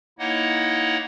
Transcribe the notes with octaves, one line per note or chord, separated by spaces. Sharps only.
A#3 D#4 E4 C#5 D#5 F#5